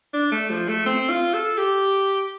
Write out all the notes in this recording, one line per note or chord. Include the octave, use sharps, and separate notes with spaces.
D4
A3
F3
A3
C4
F4
A4
G4